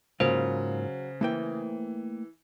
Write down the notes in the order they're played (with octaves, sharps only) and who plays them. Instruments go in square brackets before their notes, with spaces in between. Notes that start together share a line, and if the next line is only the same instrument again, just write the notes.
[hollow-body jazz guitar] G#2 A#3 F4 [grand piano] C#3 [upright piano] F#3 [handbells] C5
[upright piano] E3 [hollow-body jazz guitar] A3 A#3 G5